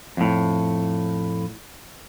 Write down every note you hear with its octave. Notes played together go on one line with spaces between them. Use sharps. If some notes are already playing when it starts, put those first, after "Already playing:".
F2 A2